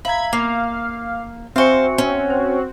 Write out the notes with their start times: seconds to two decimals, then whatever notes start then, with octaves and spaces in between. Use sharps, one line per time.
0.05 E5 F5 A#5 B5 G#6
0.33 A#3 F5 D6
1.56 C4 F#4 C5 E5 F5 G#5 C#7
1.98 C#4
2.30 C5